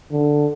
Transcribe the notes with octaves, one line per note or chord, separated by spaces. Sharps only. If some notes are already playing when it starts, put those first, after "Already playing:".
D3